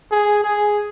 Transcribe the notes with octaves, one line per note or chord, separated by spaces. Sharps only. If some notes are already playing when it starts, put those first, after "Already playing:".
G#4
G#4